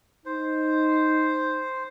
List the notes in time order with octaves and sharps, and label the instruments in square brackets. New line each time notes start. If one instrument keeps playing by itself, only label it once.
[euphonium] D#4 [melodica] C5